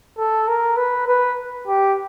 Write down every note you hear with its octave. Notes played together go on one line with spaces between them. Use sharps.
A4
A#4
B4
B4
G4